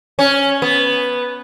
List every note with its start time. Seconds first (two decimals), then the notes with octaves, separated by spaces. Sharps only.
0.19 C#4
0.62 B3